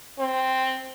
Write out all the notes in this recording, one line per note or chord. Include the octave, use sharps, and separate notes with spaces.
C4